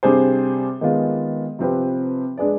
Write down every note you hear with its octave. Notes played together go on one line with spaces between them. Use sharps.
C3 G3 D4 G#4 C5
D#3 G#3 B3 F4
C3 F3 C4 G4 B4
G#3 D4 G#4 B4 D5